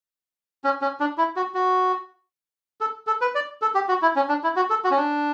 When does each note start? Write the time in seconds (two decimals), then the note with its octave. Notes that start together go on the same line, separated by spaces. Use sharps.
0.64 C#4
0.82 C#4
1.00 D4
1.18 E4
1.36 F#4
1.54 F#4
2.81 A4
3.07 A4
3.21 B4
3.35 D5
3.62 A4
3.75 G4
3.89 F#4
4.02 E4
4.16 C#4
4.29 D4
4.44 E4
4.56 F#4
4.70 A4
4.84 F#4
4.91 C#4
4.97 D4